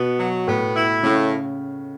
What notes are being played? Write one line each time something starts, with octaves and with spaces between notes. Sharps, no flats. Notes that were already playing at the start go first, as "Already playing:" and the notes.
Already playing: B2 B3
F#3
A2 B3
E4
A2 C#3